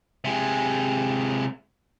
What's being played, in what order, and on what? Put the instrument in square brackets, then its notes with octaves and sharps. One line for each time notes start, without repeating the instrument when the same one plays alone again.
[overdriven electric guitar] C3 G#3